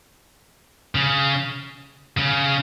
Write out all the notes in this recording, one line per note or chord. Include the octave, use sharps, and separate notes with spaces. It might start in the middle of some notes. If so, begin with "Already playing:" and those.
C#3
C#3